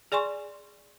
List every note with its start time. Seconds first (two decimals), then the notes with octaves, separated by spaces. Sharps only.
0.12 G#4 D5 G#5 C6 C#6